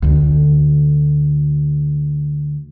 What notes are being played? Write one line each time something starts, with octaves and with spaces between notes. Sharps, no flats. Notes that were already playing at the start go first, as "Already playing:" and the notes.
D2 D3